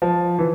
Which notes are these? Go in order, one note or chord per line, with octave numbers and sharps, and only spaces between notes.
F3
E3